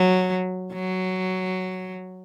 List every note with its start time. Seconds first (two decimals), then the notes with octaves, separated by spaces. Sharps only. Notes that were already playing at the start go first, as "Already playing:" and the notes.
Already playing: F#3
0.73 F#3